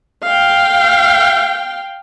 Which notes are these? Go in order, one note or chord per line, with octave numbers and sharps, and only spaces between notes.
F5 G5